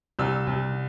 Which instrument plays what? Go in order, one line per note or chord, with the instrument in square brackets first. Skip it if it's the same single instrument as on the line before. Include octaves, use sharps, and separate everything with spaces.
[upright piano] C2 E6
C2